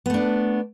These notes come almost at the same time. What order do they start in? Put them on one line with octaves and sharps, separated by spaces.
B3 A3 D4